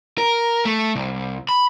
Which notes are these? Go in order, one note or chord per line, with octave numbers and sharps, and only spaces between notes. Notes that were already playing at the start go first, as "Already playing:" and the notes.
A#4
A3
C2
B5